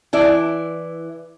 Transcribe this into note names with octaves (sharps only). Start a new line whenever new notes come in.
E3 E4 D5